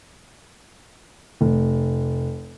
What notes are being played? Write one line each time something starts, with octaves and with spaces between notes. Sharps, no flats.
F1